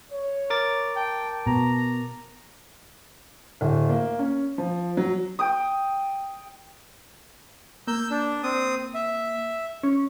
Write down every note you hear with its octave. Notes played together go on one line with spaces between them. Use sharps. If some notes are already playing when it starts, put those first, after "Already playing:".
C#5
A#4 D6 A6
G5 A5
B2 A#5
D1
A#3
C#4
F3
F#3
G5 D#6
A#3 E6 G6
D4
C4 D#6
E5
C#4